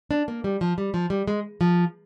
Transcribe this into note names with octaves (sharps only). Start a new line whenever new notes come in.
D4
A#3
G3
F3
G3
F3
G3
G#3
F3